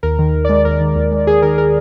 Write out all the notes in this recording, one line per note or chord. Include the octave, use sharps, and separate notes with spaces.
D#2 A#4
D#3
D#2
G#3 D5
D#2 A#4
D#3
D#2
G#3
D#2 G#4
D#3 A#4
A#4